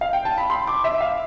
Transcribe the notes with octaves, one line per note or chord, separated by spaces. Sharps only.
F5
G5
A5
B5
C6
D6
E5
F5